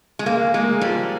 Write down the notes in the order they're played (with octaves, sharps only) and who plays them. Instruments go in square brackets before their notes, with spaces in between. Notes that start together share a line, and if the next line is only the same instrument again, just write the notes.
[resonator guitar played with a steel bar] G#3
[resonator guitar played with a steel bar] A#3 [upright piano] G#4
[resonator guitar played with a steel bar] G#3 [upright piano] A#3
[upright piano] F3 [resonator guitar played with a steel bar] G3